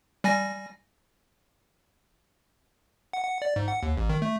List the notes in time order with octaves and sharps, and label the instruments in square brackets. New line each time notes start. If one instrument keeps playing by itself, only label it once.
[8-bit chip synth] G3 G#5 A#6
F#5
F#5
D5
G#2
F#5
D#2
A1
D#3
A3